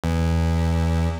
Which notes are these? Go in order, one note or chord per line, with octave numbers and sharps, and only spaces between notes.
E2